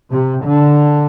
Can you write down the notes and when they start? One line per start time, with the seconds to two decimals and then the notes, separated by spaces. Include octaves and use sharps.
0.11 C3
0.43 D3